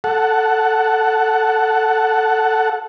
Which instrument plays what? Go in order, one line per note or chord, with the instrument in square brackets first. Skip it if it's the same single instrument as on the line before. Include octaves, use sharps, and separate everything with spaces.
[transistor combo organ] A4 F#5